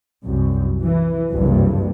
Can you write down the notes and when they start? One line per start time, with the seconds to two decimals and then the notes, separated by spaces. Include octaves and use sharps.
0.23 C2 F#2
0.82 E3
1.31 F#1 C2 G2